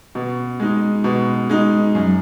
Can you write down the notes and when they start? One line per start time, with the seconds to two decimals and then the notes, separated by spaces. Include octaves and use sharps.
0.15 B2
0.60 G#3 D#4
1.04 B2
1.50 G#3 D#4
1.95 F#2